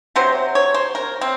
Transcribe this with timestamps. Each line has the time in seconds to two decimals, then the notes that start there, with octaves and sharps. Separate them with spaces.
0.16 C3 F#3 C5
0.55 C#5
0.74 C5
0.95 A#4
1.21 C4